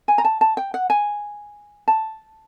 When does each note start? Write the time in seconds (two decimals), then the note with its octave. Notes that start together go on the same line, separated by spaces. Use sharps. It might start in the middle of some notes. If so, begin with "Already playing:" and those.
0.08 G#5
0.18 A#5
0.25 A5
0.41 A5
0.57 G5
0.74 F#5
0.90 G#5
1.88 A5